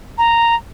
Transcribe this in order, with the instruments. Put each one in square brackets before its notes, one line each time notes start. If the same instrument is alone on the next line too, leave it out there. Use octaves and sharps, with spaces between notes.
[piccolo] A#5